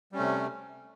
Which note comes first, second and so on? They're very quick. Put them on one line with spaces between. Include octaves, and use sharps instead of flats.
G3 C#4 A3 C3